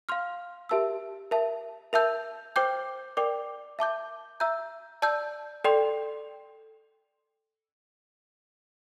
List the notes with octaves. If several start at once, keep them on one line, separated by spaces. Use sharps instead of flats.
F5 C6 F6
G4 A#4 E5 A5 E6
A#4 E5 A5
A#4 E5 A5 E6 G6
C5 G5 D6 G6
A#4 D5 G5 D6
E5 A5 D6 G6
E5 A#5 E6 G6
D5 A5 E6 G6
A4 D5 G5 C6